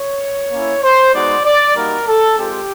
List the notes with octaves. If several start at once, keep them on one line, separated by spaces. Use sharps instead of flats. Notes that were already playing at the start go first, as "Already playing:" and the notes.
Already playing: C#5
A#3 C#4 E4
C5
G#3 B3 D#4 F#4 D5
D5
G3 A#3 D#4 F#4 A#4
A4
G#3 C4 F4 G4